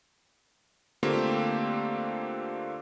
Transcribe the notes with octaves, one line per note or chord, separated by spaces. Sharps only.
D3 A3 A#3 C4 F4 G4